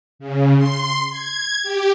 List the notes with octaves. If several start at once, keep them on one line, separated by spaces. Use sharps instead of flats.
C#3
C6
G#6
G4